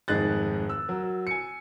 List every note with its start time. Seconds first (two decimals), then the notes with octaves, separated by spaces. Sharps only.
0.08 F1 G#2 D#3 G#4 F#6 A6
0.69 E6
0.89 F#3 A#4
1.27 G#5 C#7